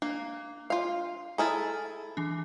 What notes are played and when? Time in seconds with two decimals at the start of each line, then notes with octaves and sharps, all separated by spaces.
0.02 A#3 D4
0.70 F4 F5
1.38 E4 G#4 A4 A#5 F6 A6
2.17 E3 D4